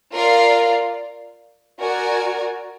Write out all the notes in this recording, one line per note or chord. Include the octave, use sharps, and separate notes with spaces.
F4 A#4 D5 F5
F#4 A#4 D5 G#5